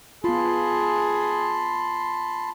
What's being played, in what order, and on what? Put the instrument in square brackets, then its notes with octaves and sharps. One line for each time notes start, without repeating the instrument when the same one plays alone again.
[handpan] B3 F4 [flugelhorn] G#4 [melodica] A5 B5 C6